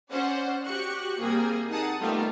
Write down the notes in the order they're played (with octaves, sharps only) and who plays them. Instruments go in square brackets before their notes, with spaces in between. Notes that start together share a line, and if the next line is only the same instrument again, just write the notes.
[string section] C#4 C5 D5 F#5
F#4 G4 C#6 F#6
C3 G3 A#3 G#4
D#4 G#4 F#5 A5 D#6
D#3 G3 A3 B3 F4